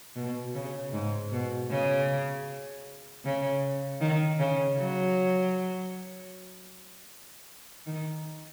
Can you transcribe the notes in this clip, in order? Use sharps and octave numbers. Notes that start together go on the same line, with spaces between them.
B2
C#3
G#2
B2
C#3
C#3
D#3
C#3
F#3
D#3